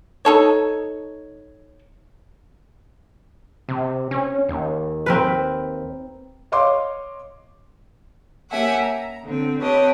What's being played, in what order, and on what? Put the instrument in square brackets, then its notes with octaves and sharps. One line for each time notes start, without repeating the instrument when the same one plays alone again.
[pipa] D#4 A4 C#5
[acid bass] C3
C#4
D#2
[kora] C4 A#4 B4
[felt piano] C#5 D#5 F5 C6 D6
[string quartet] A#3 C#4 G4 E5 F#5 G#5
A#5
D3 C4
C4 G4 B4 C#5 D#5 A5